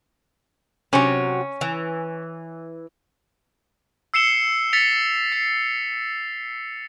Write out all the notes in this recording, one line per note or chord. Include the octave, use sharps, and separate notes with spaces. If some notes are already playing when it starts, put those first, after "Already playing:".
C3 F#3 C#4
E3
E6 C7 C#7 E7 G7
A6 B6 C#7 F7
C7